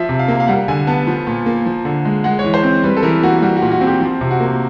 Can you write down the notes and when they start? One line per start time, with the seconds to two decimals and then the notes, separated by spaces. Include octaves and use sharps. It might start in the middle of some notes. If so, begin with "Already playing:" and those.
Already playing: F3 E5
0.09 C3
0.19 F5
0.28 A#3
0.40 F5
0.48 G3 F#5
0.68 D3 G#5
0.87 B3 A5
1.07 F3
1.27 A#2
1.46 A#3
1.66 F3
1.85 D3
2.05 G#3
2.24 G#3 F#5
2.39 C#5
2.44 E3
2.54 C5
2.63 C4
2.84 G3 B4
2.97 A4
3.03 E3 A#4
3.23 A#3 F#4
3.42 G3 F#4
3.57 F#4
3.62 A#2
3.71 F#4
3.81 C4
3.87 G4
4.01 F3
4.21 C3
4.31 F#4
4.40 A#3